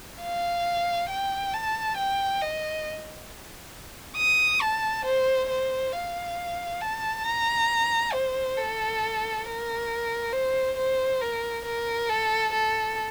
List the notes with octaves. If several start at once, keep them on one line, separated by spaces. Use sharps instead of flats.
F5
G5
A5
G5
D#5
D#6
A5
C5
C5
F5
A5
A#5
C5
A4
A#4
C5
C5
A#4
A#4
A4
A4